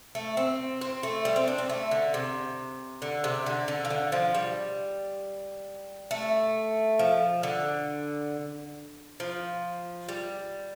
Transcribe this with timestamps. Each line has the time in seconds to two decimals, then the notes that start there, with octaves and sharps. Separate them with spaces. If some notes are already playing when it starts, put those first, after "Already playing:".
0.15 A3
0.37 C4
0.81 C4
1.03 A3
1.25 G3
1.36 C4
1.48 D4
1.58 C4
1.69 A3
1.91 D3
2.14 C3
3.02 D3
3.24 C3
3.46 D3
3.68 D3
3.85 F3
3.90 D3
4.12 F3
4.35 G3
6.11 A3
6.99 F3
7.43 D3
9.20 F3
10.09 G3